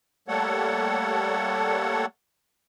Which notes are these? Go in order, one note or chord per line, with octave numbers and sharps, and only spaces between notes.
G3 A3 A#3 A4 C#5 F#5